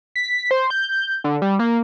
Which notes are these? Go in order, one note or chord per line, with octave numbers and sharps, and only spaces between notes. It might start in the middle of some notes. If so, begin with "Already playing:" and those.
B6
C5
G6
D3
G3
A#3